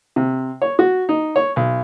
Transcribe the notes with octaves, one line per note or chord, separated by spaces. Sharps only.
C3
C#5
F#4
D#4
C#5
B1